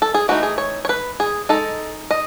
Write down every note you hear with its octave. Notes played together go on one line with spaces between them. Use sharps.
A4
G#4
E3 A3 D#4 F#4
G#4
C#5
C#5
B4
G#4
G#3 D#4 A4
D#5